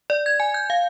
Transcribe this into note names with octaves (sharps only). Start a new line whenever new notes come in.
D5
G#6
G#5
G6
F5